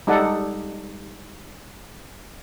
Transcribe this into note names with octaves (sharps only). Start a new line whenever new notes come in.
G3 G#3 D#4 A4 D5 F#5